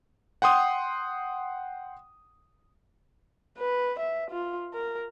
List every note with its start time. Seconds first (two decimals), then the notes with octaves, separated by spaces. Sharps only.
0.42 F#5 G5 C6 D#6
3.57 B4
3.99 E5
4.31 F4
4.73 A#4